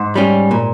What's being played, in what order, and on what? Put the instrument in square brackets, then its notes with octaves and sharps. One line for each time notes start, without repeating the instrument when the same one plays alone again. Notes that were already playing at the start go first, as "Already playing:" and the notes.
Already playing: [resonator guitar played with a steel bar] G#2
[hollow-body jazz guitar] G3 C#4 G4
A#2